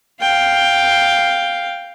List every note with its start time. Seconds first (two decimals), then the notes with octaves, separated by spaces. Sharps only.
0.21 F5 G5